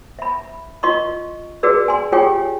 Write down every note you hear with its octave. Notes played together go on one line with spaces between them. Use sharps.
E5 B5
F4 D#5 C6 C#6
F#4 G#4 B4 D5 E6
G#5 C6
F4 G4 G#4 C#5 G5 G#5